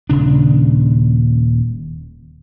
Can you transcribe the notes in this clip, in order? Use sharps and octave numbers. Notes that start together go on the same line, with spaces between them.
D#1 C#3 D4